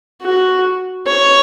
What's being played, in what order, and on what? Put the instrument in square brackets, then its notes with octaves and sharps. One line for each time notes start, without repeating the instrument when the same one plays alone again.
[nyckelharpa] F#4
C#5